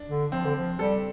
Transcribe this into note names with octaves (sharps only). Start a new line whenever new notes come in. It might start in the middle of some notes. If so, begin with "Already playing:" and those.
Already playing: D4
D3
F3 C4
D3
F3
G3 A4